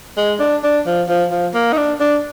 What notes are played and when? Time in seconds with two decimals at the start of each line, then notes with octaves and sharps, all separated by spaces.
0.17 G#3
0.40 D4
0.64 D4
0.86 F3
1.09 F3
1.31 F3
1.54 A#3
1.73 D#4
1.77 D4
2.00 D4